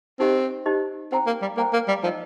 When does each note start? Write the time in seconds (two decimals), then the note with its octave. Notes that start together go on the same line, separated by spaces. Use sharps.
0.19 C4 D#4 G4 C5 D#5
0.66 D#4 G4 C5 D#5
1.12 C4 C5 G5 A#5
1.27 A#3
1.42 G3
1.57 A#3 C5 G5 A#5
1.73 A#3
1.88 G3
2.03 F3 D#4 A#4 D#5